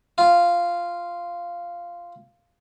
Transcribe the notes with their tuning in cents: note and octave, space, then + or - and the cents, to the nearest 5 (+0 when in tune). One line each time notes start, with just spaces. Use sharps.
F4 -5